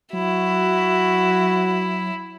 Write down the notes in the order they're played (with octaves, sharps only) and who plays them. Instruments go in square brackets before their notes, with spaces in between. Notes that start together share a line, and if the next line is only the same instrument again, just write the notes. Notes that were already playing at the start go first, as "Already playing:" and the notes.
[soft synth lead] F#3 [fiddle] E4 [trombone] F#4